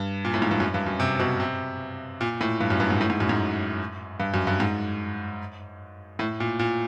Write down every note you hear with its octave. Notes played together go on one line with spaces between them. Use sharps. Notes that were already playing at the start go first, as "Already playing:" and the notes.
Already playing: G2
A#2
A2
G#2
G2
F#2
G2
F#2
C3
B2
C3
A#2
A2
G2
F#2
G2
G#2
A2
G#2
F#2
G#2
G2
F#2
G2
G#2
A2
A#2
A#2